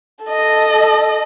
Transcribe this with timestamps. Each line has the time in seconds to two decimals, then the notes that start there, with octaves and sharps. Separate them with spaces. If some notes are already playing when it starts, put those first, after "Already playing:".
0.25 A4 D#5